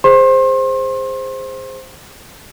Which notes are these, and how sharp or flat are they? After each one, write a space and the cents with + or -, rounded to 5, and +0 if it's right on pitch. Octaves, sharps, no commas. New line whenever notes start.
G#4 -20 C5 +0 C6 +35